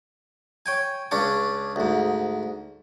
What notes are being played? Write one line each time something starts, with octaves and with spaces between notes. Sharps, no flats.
C#5 G5 G#5
C#2 C#4 D4 C#5 C#6
D2 G#2